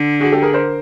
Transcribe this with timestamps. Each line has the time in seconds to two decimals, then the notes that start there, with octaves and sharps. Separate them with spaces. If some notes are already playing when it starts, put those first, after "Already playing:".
Already playing: D3
0.20 F#4 G#4
0.32 G4 A4
0.42 G#4 A#4
0.53 A#4 C5